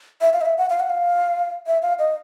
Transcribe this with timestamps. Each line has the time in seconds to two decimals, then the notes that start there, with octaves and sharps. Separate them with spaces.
0.21 E5
0.33 F5
0.41 D#5
0.45 E5
0.58 F#5
0.70 F5
0.80 F#5
0.90 F5
1.67 E5
1.82 F5
1.99 D#5